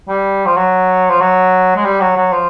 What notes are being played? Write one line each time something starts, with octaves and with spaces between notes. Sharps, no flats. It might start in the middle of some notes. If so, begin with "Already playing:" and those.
G3
F3
F#3
F3
F#3
G#3
G3
F#3
F#3
F3